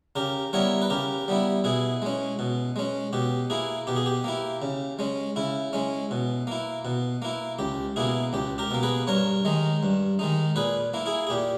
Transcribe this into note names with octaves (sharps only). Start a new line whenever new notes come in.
C#3 G4 A#4
G3 B3 E4 A#4 C#5
B4
C#3 G4 A#4
G3 B3 E4
B2 E4 G#4
G#3 C#4
B2
G#3 C#4
B2 G4
A#3 E4 G#4
B2 G4
G#4
G4
A#3 E4
C#3
G#3 C#4
C#3 E4
G#3 C#4
B2
A#3 E4
B2
A#3 E4
C#2 G4
B2 A#3 E4 G#4
C#2 G4
G4 A#4
B2 A#3
G#4 B4
G2 A#4 C#5
D#3 G#3 D#4
G2
D#3 G#3 D#4
A#2 G#4 B4
A#3 E4
E4 G#4
G#4
A#2 G4